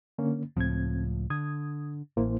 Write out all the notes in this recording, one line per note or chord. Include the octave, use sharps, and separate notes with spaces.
D3 A#3 C#4
C#2 A2 F3 C4 G#6
D3 D#6 G#6
A1 A#3 E4 C5